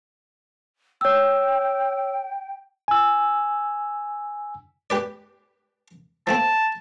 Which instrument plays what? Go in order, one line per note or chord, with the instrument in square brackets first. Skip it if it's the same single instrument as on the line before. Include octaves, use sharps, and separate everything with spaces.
[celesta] C#5 E6 [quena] G5
[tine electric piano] G#5 E6
[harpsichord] G4 B4 D5
[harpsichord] F3 A3 C4 [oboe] A5